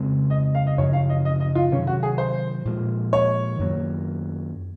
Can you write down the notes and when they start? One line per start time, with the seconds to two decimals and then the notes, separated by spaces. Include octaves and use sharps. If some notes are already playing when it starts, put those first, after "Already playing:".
Already playing: F2 C#3 G#3 C4
0.30 D#5
0.55 F5
0.67 D#5
0.78 F#2 C#3 F3 C#5
0.93 F5
1.09 D#5
1.25 D#5
1.40 D#5
1.55 F4
1.72 C3 D#3 F#3 C#4
1.87 F#4
2.03 G#4
2.18 C5
2.65 A#2 F3 G#3
3.13 C#5
3.59 F#2 D#3 F#3 A#3